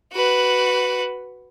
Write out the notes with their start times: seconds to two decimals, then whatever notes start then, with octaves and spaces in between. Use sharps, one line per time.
0.13 F#4 B4